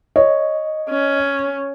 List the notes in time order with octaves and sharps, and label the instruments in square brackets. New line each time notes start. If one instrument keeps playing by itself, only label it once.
[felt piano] C#5 [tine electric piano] D#5
[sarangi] C#4